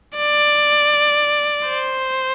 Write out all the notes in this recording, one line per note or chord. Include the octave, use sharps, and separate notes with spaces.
D5
C5